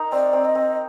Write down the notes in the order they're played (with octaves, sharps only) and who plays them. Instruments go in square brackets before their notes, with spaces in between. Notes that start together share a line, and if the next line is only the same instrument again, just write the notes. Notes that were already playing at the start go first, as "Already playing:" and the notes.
Already playing: [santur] D#4 A#4
[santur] C4 [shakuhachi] D5
[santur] C4
[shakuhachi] D#5
[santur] C4